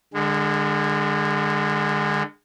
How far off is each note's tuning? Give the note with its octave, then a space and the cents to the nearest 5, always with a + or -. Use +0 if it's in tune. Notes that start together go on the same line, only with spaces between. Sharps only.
D3 +20 G#3 -25